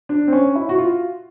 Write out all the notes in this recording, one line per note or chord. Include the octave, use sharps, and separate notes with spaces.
D4
C4
C#4
E4
F#4
F4